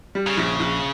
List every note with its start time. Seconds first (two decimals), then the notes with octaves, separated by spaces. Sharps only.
0.15 G3
0.27 C#3
0.37 A#1
0.60 A#1